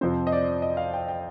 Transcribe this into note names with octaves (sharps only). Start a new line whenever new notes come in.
F2 C3 F3 C4 C5
D#5
D5
D#5
F5
G5
G5